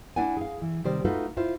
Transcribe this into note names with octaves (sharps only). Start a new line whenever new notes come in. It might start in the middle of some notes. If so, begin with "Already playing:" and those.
D4 E4 D5 F#5 G#5
G#4 F5
E3
C3 D#3 G3 C5 D5
A3 D#4 F4 F#4 A4 B4
E4 F4 C5